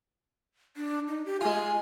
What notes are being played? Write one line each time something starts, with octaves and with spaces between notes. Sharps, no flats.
D4
D#4
G4
G#3 F4 G#5